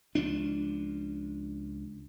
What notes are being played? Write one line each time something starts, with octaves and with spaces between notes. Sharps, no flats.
C#2 F3 D4